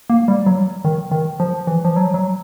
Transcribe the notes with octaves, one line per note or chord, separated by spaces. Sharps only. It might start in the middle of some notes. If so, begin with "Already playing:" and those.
A#3
G3
F#3
D#3
D#3
F3
E3
F3
F#3
F#3